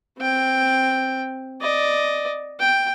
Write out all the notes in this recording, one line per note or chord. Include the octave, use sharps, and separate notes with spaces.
C4 G5
D5 D#5
G5